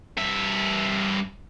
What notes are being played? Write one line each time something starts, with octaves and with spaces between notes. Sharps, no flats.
G2 E5